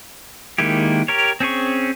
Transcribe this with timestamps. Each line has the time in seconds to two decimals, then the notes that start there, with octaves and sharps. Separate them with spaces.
0.58 D#3 G#3 A#3 E4 G4
1.08 G4 A#4 C#5
1.40 C4 C#4 G#4 C#6